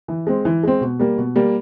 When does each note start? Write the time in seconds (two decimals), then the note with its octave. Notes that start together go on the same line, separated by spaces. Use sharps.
0.08 E3
0.27 G#3 C4
0.45 E3
0.63 G#3 C4
0.81 B2
0.99 G3 A#3
1.18 B2
1.36 G3 A#3